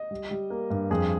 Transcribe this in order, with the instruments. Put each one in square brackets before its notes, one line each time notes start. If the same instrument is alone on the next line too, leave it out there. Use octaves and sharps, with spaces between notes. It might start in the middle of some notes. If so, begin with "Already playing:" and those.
Already playing: [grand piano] D#5
G3
G3
A#3
G2
F2 G#4